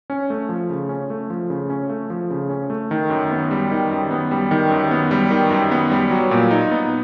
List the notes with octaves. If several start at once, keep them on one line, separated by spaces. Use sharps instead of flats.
C#4
A3
F3
C#3
C#4
A3
F3
C#3
C#4
A3
F3
C#3
C#4
A3
D#3
F#2
B3
G3
D#3
F#2
B3
G3
D#3
F#2
B3
G3
D#3
F#2
B3
G3
F#3
A#2
D#4
B3